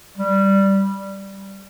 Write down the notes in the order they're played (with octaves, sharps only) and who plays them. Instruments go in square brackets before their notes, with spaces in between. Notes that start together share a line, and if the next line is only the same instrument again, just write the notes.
[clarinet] G3